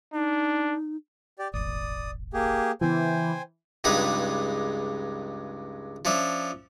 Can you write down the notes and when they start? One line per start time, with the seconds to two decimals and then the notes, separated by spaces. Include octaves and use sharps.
0.14 D4 D#4
1.39 G4 D5
1.54 D#1 G#1 D5 D#6
2.33 A#3 G4 G#4
2.81 C#3 E3 B3 C5 G5 G#5
3.84 C#2 G2 G#3 D#4 B4 B5
6.05 F3 C#4 D4 E5